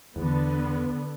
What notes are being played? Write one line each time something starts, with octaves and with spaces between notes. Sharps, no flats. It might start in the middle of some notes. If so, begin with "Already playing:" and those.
E2 D3 B3